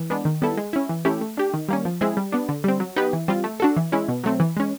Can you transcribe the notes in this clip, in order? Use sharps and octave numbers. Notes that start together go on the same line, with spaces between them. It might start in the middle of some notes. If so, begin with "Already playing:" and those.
Already playing: E3
G#3 B3 D4
D#3
G3 B3 E4 A4
G#3
C#4 E4
E3
A3 C#4 E4 G4
A3
D4 G4
D#3
G3 A#3 C#4
F3
G#3 C4 E4 G#4
G3
B3 D4
D3
G3 C4
F#3
B3 D#4 G4 B4
E3
G3 C4 F4
A3
D4 F#4 A4
E3
G#3 C#4 E4
B2
F#3 A3 C4
E3
G#3 C#4